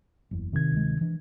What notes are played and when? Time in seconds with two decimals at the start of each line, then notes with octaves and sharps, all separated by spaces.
0.31 F#1 E2
0.53 C3 D#3 G#6
0.72 D1 G#3
1.01 E3 D4